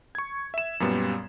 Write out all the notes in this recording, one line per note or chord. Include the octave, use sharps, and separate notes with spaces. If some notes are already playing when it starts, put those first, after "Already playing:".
C#6 G#6
E5 E7
F#2 A#2 G3 B3